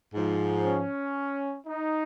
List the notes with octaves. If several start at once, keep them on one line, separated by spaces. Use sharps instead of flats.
G#2 F3
C#4
D#4